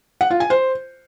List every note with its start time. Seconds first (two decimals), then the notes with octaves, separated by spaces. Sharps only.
0.21 F#5
0.30 F4
0.40 G#5
0.50 C5